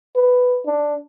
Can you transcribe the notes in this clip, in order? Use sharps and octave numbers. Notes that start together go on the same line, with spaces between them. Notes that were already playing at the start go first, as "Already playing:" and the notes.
B4
D4